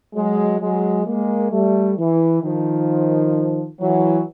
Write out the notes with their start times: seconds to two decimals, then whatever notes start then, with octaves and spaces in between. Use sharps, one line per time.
0.15 F#3 G#3
0.60 F#3 G#3
1.05 G#3 A#3
1.51 G3 A3
1.97 E3
2.42 D#3 F3
3.79 E3 F#3